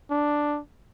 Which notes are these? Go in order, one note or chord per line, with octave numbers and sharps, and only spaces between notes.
D4